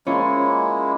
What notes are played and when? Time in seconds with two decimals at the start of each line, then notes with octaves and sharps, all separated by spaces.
0.07 G#3 A#3 C#4 E4 F4 C#5